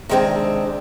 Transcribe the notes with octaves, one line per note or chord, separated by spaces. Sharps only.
C3 D#3 G#3 C4 D4